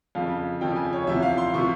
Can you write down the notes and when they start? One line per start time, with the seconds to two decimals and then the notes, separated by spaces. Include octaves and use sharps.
0.15 F2 C#3 F3 F5
0.61 F2 C#3 F3 G5
0.76 G#5
0.93 C#5
1.07 E2 C3 F3 E5
1.22 F5
1.38 C6
1.54 C3 F3 C#6